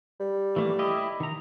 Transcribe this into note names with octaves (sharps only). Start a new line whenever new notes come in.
G3
E3 A3 A#3
E4 G4 D#5
D#3 A#5